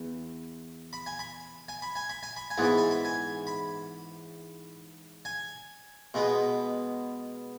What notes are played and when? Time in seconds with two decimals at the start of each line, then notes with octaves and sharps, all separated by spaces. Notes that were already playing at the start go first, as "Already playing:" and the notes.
Already playing: E2
0.93 B5
1.06 G#5
1.19 B5
1.68 G#5
1.82 B5
1.95 G#5
2.09 B5
2.23 G#5
2.37 B5
2.50 G#5
2.58 G#2 E3 B3
2.64 B5
2.78 G#5
2.91 B5
3.05 G#5
3.47 B5
5.25 G#5
6.14 B2 G#3 B3